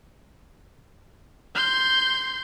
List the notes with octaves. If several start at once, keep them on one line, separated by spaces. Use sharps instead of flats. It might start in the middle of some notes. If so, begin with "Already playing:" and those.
C6 G6